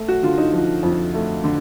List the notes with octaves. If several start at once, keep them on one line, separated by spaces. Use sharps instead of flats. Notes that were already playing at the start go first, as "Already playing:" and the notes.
Already playing: A3
F#4
D3 F4
D#4
F3
F2
A3
D3